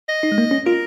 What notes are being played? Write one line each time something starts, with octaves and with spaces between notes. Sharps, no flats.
D#5
D#4
G#3
A#3
C#4
F4 A#4